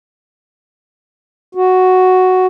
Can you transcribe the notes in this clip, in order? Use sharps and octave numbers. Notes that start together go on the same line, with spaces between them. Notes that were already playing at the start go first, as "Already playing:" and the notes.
F#4